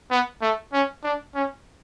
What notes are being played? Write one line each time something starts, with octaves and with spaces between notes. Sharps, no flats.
B3
A3
C#4
D4
C#4